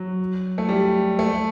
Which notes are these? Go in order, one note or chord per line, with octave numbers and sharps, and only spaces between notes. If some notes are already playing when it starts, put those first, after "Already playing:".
Already playing: F#3
A3
G3
A3